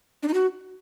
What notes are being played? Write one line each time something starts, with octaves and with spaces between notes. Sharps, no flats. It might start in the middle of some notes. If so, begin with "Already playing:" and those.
D4
D#4
F#4